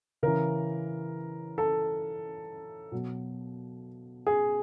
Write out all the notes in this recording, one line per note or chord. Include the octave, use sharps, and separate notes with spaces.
C#3 E3 A#4
A4
B2 F#3
G#4